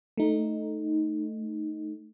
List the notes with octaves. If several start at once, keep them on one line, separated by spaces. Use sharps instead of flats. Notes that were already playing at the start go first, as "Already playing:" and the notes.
A3 D#4